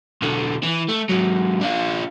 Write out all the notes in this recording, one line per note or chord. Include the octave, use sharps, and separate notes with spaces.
B1 D3
E3
A3
G#2 F#3
D4 F4